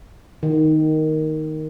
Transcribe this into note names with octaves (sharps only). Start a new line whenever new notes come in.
D#3